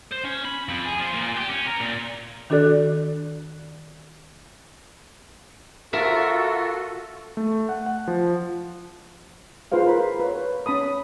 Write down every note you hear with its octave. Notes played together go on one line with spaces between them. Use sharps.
C5
C#4
B5
F2
G#4
F3
A#2
G4
C#4
A#4
A#2
D#3 D4 F#4 A4 D5 F#6
F4 F#4 A4 A#4 E5
A3
F#5
F#5
F3
F4 G#4 B4 C5 F5
A#4 B5
B4 C#5
C#4 A5 B5 D#6